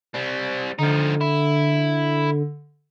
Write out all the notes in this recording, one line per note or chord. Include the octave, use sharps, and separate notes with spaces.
G3 C4
D3 F3 D#4
E4